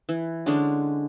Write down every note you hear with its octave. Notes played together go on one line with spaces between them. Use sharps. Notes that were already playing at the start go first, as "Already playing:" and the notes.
E3
D3 G#3 C#4 D4